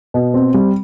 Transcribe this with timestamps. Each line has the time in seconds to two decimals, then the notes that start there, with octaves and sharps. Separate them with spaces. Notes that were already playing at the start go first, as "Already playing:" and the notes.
0.14 B2
0.34 C4
0.54 G3